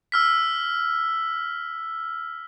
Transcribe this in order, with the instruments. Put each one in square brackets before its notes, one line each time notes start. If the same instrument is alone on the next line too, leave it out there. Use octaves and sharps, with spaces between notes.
[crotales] E6 F6 B6